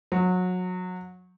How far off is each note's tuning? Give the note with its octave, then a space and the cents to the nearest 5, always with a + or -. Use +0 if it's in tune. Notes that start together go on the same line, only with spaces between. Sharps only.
F#3 -25